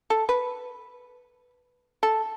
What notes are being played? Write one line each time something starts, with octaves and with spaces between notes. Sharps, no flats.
A4
B4
A4